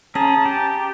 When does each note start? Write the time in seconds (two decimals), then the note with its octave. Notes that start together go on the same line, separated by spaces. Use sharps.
0.15 C#4 G#4 A5 A#5
0.45 G4